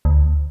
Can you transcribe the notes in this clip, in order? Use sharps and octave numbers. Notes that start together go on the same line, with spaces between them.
D2